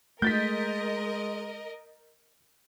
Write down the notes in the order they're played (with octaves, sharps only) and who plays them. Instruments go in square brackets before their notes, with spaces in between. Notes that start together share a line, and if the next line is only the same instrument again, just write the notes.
[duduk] G#3 [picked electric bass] A3 [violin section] A#4 D#5 [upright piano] G6 A6 B6